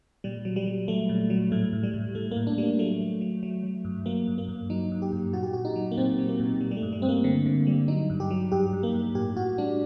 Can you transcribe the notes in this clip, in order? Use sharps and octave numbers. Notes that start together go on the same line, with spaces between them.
A#2 G3
F#3
G3
F#3
F#3 A3
A#2
F#3
A2 A3
A2
G3
A2
A2 A3
A#3
A2
D4
G3 A#3
F#3 A3
F#3
F#3
F#3
F#3
G2
F#3 A#3
G2
A#3
G2
F#3 D#4
G2
G4
G2
A#2 F#4
G4
A#2 F#4
D#4
F#3
A#3
A#2 C4
F#3
A#3
A#2
G3
G3
A3
G2
G3
G2 C4
A#3
D3 C4
D3
G3
F#3 D#4
G2
G4
F#3
G2 G4
G2
A#3
G2
A2 G4
A2 F#4
G3 D4